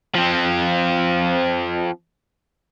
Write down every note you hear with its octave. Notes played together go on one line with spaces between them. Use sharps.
F3 C4